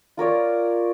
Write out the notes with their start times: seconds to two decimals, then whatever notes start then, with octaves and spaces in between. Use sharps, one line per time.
0.17 F4 A#4 C#5 D5